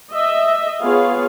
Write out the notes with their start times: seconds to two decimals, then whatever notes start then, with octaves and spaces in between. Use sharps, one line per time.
0.13 D#5 E5
0.82 B3 F4 G#4 C#5 F5